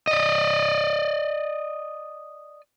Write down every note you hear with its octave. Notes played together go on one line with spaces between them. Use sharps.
D5 D#5